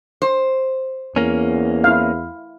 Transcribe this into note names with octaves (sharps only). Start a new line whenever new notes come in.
C5
E2 A#3 C#4
E4 F5